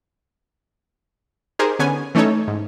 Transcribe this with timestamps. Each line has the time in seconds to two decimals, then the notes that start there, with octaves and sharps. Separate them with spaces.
1.59 D#4 G4 G#4 A#4 C5
1.79 D3 B3 C#4 G#5
2.15 E3 A3 C#4 D#4 A4 C#5
2.48 G#2